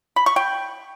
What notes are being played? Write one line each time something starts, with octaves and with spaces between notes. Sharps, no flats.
B5
C#6
G5